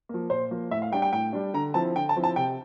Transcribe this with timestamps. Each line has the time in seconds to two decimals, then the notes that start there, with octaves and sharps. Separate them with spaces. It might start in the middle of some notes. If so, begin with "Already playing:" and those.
0.09 F3 A#3
0.30 A#2 C5
0.51 F3 A#3
0.71 A2 E5
0.82 F5
0.92 G3 D4 G5
1.02 G5
1.13 A2 G5
1.33 G3 D4
1.54 D3 A#5
1.74 F3 C4 E4 A5
1.96 D3 G5
2.09 A5
2.16 F3 C4 E4
2.24 A5
2.36 C3 G5